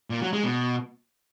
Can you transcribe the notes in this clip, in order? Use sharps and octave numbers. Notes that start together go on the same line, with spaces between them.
A#2
F#3
G#3
B2